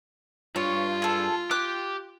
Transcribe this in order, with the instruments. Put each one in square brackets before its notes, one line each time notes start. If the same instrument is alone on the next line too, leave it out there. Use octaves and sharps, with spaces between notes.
[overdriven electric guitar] G2 [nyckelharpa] F4 [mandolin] C#5
[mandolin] G#4 A4
[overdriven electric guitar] G4 [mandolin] D6 F#6